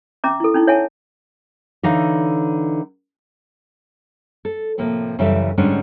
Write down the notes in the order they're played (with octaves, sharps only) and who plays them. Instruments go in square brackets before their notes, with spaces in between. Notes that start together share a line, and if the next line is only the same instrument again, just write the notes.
[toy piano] C#4 E5 A#5 D6
E4 A4
C#4 D#4 E4
C#5 E5 F#5 G#5 A5
[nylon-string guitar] D3 E3 D#4 C#5 F5
A4
A2 C3 F3 A#3
F#2 C#3 E3 G3 A4 E5
G#2 D3 G3 G#3 C#4 D4